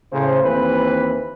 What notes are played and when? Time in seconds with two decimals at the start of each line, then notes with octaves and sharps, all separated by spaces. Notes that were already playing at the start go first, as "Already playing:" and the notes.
0.13 A2 C#3 C5
0.43 D#2 E3 C4 B4